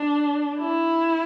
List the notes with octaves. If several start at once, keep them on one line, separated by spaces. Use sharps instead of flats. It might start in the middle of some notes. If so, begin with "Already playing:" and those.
Already playing: D4
E4